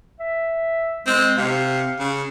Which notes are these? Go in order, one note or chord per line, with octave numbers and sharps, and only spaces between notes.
E5
G#3 C4
C3 F5
C#3